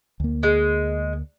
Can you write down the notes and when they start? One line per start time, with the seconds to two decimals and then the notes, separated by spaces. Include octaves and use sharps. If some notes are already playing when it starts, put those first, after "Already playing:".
0.20 D2 A#3
0.43 G#3